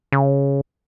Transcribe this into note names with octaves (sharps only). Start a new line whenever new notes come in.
C#3